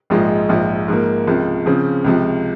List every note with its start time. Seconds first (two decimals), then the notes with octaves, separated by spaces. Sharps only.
0.10 A#1 G#2 F3 G#3
0.49 A#1 G#2 F3
0.88 G#2 F3 A#3
1.27 C#2 C3 F3
1.66 C#3 F3 C4
2.04 C#2 C3 F3